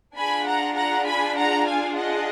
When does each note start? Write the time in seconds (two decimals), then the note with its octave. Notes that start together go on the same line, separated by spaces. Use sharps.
0.16 D4 F4 G#4 G#5 B5
0.46 F#5 A#5
0.76 F#5 A#5
1.06 G#5 B5
1.36 F#5 A#5
1.66 F5 G#5
1.95 D#5 F#5